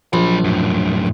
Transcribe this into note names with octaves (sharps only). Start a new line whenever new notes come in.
A#1 F#3 B5
F#2 A2